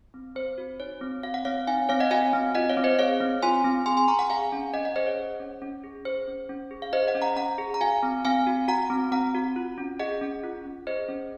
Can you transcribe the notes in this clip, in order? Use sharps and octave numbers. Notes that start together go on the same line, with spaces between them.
C4
C4 C5
F#4
D#4 C#5
C4
F#4 F5
F#5
C4 C#5 F5
D#4 F5 G#5
C4 C#5 F5
D#5 F#5
F#4 F5 G#5
C4
F4 D#5 F#5
C#5 F5
C4
C5 D#5
G#4 C#5 F5
C4
F4 G#5 C6
C4
G#4 G#5 C6
G#5 C6
C4 A#5 C#6
F#5 A#5
G#4 F5 G#5
C#4
C#4 D#5 F#5
D#5 F#5
G#4 C5 D#5
C#5
G#4
C#4
C#4
G#4
G#4 C5
C#4
C#4
G#4
F5
G#4 C5 D#5
D#5 F#5
C#4
F#5 A#5
C#4 F#5 A#5
G#4
A#5
F#4 F5 G#5
C4
C4 F5 G#5
F#4
F#4 F#5 A#5
C4
C4 F#5 A#5
F#4
F4
C#4
G#4 D#5 F#5
C#4
F4
C#4
G#4 C5 D#5
C#4